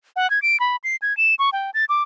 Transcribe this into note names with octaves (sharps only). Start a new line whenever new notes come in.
F#5
G#6
D7
B5
C7
G#6
E7
C#6
G5
A6
D6